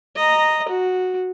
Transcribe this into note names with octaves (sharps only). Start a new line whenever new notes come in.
D#5 A#5
F#4